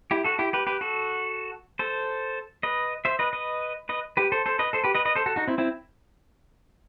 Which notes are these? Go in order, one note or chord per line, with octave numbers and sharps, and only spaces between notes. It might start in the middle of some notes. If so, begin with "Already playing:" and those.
E4 G4
F#4 A4
E4 G4
G4 B4
G4 B4
F#4 A4
A4 C5
B4 D#5
C5 E5
B4 D#5
B4 D#5
B4 D#5
G4 B4
A4 C5
A4 C5
B4 D#5
A4 C5
G4 B4
B4 D#5
B4 D#5
A4 C5
F#4 A4
D#4 F#4
C4 E4
C4 E4